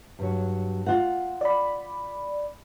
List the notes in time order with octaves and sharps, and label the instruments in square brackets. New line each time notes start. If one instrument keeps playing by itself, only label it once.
[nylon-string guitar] G2 F#3
F4 F#5
[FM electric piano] D5 B5